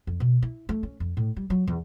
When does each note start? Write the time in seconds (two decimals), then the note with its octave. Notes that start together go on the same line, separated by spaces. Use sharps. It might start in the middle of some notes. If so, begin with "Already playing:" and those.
0.07 F2
0.20 B2
0.42 E4
0.69 A3
0.83 C#4
1.00 F2
1.17 A2
1.37 G3
1.50 F#3
1.67 E2